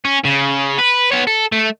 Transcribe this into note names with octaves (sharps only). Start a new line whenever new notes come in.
C#4
C#3
B4
B3 C#5
A4
A3